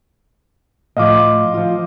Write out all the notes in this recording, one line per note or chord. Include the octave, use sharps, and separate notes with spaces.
A2 F3 D#5 F5 D6
F3 F4